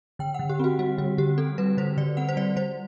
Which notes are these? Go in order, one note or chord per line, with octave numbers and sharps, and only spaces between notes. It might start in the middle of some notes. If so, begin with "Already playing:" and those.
D3 G5
D3 F#5
G4
C4 F#4
G3 F#4
D3 F#4
D3 G4
C4 A4
G3 B4
D3 C5
D3 D5
C4 F#5
C5
G3 D5
G3 C5